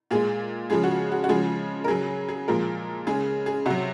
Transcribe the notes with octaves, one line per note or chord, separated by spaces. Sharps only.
A#2 G#3 G#4
C#3 F3 G#3 G#4
F#4
F#4
F#4
C#3 F3 G#3 G#4
A#4
C#3 F#3 G#4
G#4
A#2 F3 G#3 A#4
C#3 G#3 G#4
G#4
C3 F#3 F#4